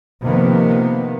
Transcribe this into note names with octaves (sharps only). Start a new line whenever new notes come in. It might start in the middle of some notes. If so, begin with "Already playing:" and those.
C3 D#3 F3 A#3 B3